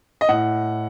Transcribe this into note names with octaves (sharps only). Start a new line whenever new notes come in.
D#5
A2 F#5